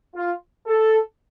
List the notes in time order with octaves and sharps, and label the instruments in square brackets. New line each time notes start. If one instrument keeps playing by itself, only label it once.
[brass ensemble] F4
A4